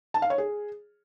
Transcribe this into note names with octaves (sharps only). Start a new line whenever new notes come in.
A5
F5
C#5
G#4